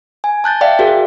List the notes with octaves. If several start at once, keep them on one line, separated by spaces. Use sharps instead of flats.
G#5
A5 F#6 G6 A6
D5 E5 F5 G5
F#4 G#4 A#4